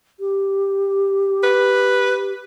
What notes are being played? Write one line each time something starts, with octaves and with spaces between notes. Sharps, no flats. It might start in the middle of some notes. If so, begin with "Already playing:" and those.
G4
B4